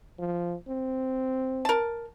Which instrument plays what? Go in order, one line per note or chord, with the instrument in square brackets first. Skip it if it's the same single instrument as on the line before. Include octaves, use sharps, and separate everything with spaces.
[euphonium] F3
C4
[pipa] A#4 A5